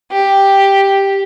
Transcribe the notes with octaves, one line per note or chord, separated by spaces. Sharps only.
G4